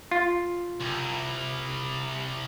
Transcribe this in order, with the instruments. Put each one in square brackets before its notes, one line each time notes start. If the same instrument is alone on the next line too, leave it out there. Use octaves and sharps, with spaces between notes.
[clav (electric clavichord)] F4
[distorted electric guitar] C2